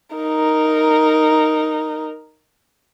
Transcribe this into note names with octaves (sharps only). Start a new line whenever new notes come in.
D#4 A#4